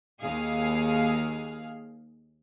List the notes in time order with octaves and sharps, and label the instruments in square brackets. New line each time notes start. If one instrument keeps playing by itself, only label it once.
[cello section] D#2 G#4 F5